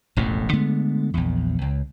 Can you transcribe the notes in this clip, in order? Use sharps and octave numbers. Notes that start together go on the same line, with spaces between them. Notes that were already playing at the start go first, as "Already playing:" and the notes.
E1 A1 F2 A2
D3 G#3 A3 B3
A#1 E2
C#2